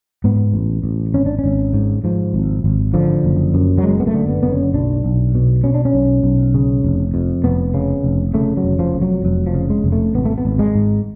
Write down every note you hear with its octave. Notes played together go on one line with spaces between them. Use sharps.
G#2 B3
A1
A1
G#1 C#4
D4
C#4
G#1
G#2
G#2 F3
G#1
G#1
D3 F3
F#1
F#2
F#3
F#1 G#3
B3
A3
D3
B3
F#1 B3
C#4
B1 D4
B1
B2
B2 C#4
D4
C#4
B1
B1
C#3
F1
F2
F1 B3
C#3
F1
C#3 A3
F#3
F1
F3
F2
F#3
F1 F#3
F3
C#3
G#3
F1
A3
G#1 B3
A3
B3
G#1
G#3
G#2